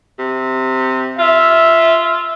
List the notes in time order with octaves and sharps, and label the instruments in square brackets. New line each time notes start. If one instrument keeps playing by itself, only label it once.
[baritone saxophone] C3
[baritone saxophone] F4 [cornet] E5